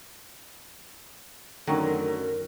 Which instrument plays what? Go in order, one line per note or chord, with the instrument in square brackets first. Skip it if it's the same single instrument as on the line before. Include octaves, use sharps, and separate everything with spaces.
[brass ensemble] F#2 [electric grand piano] D3 A3 A#6 [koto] D#3 F#3 [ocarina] A#4